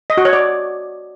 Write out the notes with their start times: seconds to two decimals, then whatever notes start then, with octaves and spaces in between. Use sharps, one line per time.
0.10 D#5
0.17 F#4
0.25 C#5
0.33 D5